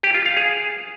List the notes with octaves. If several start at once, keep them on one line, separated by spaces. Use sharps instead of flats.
G4
F4
F5
G#4